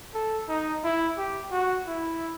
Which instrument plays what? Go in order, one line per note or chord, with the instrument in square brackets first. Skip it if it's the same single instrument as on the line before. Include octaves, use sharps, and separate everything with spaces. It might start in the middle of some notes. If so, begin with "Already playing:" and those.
[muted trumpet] A4
D#4
E4
G4
F#4
E4